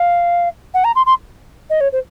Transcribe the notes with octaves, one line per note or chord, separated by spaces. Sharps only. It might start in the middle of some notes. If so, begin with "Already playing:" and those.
Already playing: F5
F#5
A#5
C6
C6
D#5
C#5
C5